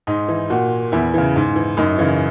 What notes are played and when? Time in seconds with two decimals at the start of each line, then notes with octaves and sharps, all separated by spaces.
0.07 G#2 D#4
0.29 E3
0.50 A#2 F#4
0.92 E2 E4
1.14 C#3 E3
1.36 G#2
1.56 E3
1.77 F#2 D#4
1.99 C#3 E3